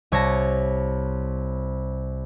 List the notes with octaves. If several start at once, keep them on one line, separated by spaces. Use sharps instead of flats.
C2 C#5 A5 A#6